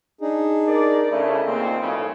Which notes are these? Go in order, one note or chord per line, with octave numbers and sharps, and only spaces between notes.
D4 D#4 G#4
A#4 D5
C#3 A3 E4 D#5
D#2 A#2 C4
B1 A2 C#3